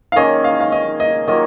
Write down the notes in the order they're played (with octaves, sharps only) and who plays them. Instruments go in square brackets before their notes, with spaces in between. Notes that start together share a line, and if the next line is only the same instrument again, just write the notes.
[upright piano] F5
[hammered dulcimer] D#3 A#3 C#4 G#4 [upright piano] D#5
[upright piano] F5
F5
D#5
D#5
[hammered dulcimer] D#3 F#3 A#3 F4 [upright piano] D#5